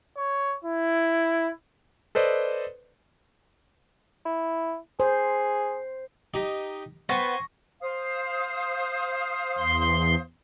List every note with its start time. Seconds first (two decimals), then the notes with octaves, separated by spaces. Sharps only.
0.17 C#5
0.64 E4
2.15 A4 B4 C5 D5 D#5
4.25 E4
5.00 G#4 C5
6.34 D#4 G4
7.09 B3 C5 G5 G#5 C#6 A#6
7.81 C5 F5 D#6
9.58 E2 C6